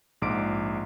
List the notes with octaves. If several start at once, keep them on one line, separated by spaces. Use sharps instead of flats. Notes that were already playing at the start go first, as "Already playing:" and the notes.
A#1 G#2 D6 D7